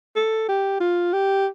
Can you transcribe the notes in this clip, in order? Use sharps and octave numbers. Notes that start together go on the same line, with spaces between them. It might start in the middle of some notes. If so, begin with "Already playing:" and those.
A4
G4
F4
G4